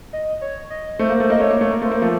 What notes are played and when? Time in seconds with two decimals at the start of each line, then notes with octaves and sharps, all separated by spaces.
0.13 D#5
0.41 C#5
0.70 D#5
0.99 A3 C5
1.09 A#3
1.20 A3
1.30 A#3 D#5
1.40 A3 C#5
1.51 A#3
1.61 A3
1.71 A#3
1.82 A3 C5
1.92 A#3
2.02 F3 A3